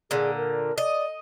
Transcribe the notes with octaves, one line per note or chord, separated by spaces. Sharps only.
A#2 D3 G#4
A#4
D5 D#5